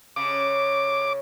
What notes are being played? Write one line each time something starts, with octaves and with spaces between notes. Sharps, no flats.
C#3 D6